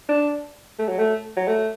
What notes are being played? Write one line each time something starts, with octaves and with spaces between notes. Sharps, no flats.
D4
A3
F#3
A3
F#3
A3